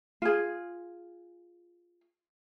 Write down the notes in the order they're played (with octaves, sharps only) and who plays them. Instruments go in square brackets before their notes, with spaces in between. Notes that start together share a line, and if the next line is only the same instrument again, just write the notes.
[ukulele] F4 G#4